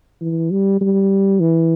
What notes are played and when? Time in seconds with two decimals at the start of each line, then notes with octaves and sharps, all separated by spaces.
0.21 E3
0.51 G3
0.81 G3
1.40 E3